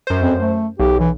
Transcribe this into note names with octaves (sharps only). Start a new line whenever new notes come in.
F#2 C5
F2
A3
B1 G4
E3